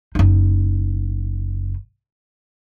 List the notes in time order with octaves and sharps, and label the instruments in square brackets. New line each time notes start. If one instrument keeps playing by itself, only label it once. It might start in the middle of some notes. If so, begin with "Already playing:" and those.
[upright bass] F#1 D#4